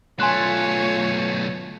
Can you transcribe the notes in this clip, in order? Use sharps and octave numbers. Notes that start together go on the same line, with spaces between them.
B1 A3 F4 C#5 G#5 C6 F#6